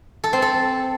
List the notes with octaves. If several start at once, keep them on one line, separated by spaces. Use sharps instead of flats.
A4
C4
A4